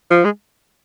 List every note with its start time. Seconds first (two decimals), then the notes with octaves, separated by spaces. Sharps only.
0.10 F3
0.25 G#3